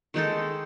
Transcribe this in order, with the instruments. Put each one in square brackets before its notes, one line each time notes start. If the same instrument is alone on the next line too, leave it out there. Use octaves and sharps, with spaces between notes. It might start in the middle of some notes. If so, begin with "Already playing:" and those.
[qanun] D#3 G#3 D#4 A4